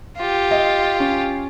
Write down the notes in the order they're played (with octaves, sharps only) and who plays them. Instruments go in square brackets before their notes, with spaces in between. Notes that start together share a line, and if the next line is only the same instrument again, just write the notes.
[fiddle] F4 G4
[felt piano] D#5
C#4